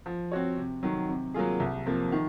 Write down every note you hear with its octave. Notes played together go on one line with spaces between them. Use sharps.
F3
C4 F#4 C#5
C3
D#3 F#3
C3
F#3 A#3 F4 G#4
C2
C3 F3 A#3
D#3